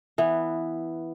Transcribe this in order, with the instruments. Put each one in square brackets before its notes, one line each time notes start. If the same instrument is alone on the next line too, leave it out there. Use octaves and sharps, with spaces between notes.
[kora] E3 B3